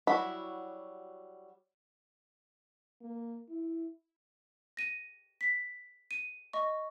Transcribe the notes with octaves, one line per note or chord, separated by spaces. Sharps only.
F#3 G3 E4 F#4 B5
A#3
E4
A#6 D#7
B6
D#7
D#5 C#6